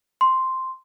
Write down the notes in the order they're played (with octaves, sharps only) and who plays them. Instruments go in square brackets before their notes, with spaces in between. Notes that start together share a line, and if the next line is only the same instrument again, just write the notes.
[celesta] C6